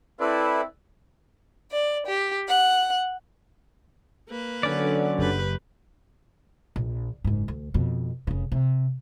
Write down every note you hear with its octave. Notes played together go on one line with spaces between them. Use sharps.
C4 E4 A4 B4 D5
D5
G4
F#5
A#3 B4
D3 F#3 C#4 D5
F#1 F#2 G4 B4
A#1
F#1 G#2
D2
F2 B2
F1 C#3
C3